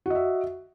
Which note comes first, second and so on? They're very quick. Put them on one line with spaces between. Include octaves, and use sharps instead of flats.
F#4 D#5 E5